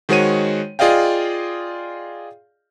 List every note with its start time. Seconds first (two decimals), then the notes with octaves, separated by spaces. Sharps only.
0.09 D#3 G#3 F#4 C5 C#5 D#7
0.79 F4 G#4 D5 D#5 F5 G5